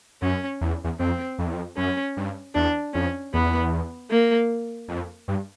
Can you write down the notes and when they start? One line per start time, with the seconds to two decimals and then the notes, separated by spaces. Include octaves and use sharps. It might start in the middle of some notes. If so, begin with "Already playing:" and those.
0.22 F#2 C#4
0.61 E2
0.84 E2
0.99 F2 C4
1.39 F2
1.47 E2
1.54 F2
1.77 F#2 C#4
2.17 G2
2.55 E2 D4
2.94 F2 C#4
3.33 E2 B3
4.11 A#3
4.88 F2
5.28 G2